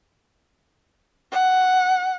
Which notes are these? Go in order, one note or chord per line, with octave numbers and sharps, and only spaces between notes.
F#5